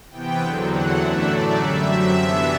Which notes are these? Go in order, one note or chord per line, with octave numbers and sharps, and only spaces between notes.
C3 E3 B3 G5
E2 D3 F#3 C4
E2 D3 F#3 F#5
F#2 E3 A3 D4 E5
A2 F#3 A3 D5
F#2 D3 G3 E5
F#2 F#3 C4
C3 E3 B3 D4